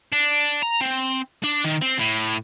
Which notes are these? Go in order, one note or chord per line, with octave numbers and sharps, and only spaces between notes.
D4
A#5
C4
D4
D#3
C4
A2